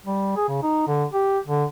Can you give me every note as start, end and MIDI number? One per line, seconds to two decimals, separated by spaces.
0.05 0.32 55
0.36 0.46 68
0.49 0.61 49
0.63 0.84 63
0.88 1.05 50
1.13 1.39 67
1.48 1.65 50